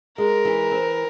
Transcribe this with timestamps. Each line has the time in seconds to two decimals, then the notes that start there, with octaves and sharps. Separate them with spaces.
0.18 G#3 A#4
0.45 E3
0.71 C4